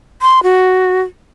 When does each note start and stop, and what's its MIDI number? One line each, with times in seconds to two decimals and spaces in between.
0.22 0.43 84
0.43 1.02 66